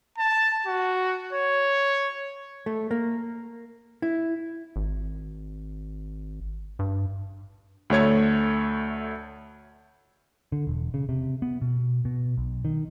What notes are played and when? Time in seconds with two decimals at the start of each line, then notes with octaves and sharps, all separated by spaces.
0.18 A5
0.66 F#4
1.33 C#5
2.66 A3
2.91 A#3
4.02 E4
4.76 G#1
6.79 G2
7.90 D2 A3 C#5 G#6
10.52 D3
10.67 E1
10.94 C#3
11.09 C3
11.42 B3
11.61 B2
12.05 B2
12.37 B1
12.65 D#3